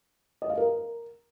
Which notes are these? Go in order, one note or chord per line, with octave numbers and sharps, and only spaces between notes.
D#5
F5
A#4